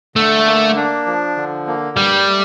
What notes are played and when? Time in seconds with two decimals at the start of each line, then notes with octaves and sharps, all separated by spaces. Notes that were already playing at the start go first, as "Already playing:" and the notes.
0.16 D3 A3
0.46 A#3
0.76 D4
1.06 F3
1.36 D3
1.67 A#3
1.96 G2 G3
2.26 A3